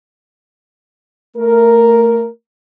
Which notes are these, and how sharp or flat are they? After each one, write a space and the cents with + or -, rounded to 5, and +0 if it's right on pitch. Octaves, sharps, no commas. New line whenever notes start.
A3 +25 A#4 +0